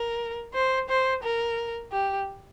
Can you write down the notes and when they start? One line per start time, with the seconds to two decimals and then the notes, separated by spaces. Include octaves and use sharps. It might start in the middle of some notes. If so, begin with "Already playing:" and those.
Already playing: A#4
0.54 C5
0.89 C5
1.23 A#4
1.92 G4